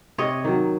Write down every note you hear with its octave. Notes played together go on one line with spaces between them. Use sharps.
C3 C#5 D#5
D#3 F#3